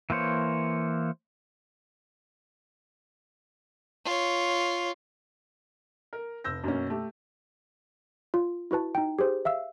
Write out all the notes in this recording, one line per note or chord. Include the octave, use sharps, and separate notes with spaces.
E3 A#3 C5 C#5
F4 C#5
A#4
F1 E6 G6 A#6
F#2 B2 A#3 C#4
A3 G4
F4
E4 F#4 B4 A5
D#4 G5
G4 G#4 C5
E5 F5 E6